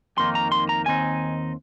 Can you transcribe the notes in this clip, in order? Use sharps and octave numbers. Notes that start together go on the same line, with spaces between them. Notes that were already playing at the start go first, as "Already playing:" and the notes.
F2 D#3 A#3 D#4 C6
A#5
C6
A#5
D#2 D#3 C4 D#4 G#5